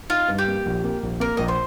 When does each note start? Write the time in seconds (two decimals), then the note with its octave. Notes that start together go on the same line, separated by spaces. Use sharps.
0.10 D#4 F4
0.29 G2
0.39 G4
0.47 A#3
0.66 A#1
0.84 A#3
1.03 A#1
1.20 A#3 A#4
1.37 A#1 D#5
1.48 C5